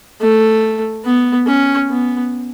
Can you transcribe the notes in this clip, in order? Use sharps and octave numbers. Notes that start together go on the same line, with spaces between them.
A3
B3
C#4
B3